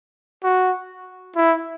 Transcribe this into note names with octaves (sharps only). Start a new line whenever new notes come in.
F#4
E4